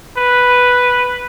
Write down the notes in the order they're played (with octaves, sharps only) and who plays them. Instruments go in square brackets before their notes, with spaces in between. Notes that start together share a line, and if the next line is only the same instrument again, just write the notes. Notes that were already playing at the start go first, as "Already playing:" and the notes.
[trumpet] B4